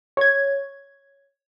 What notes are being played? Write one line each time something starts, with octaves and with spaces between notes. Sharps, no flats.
C#5 G#6